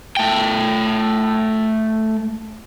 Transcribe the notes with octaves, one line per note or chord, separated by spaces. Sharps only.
A3 G5